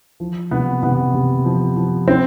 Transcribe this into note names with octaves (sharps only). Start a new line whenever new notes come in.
F3
C3 B3
C3 B3
C3
F3
F3
F3 C4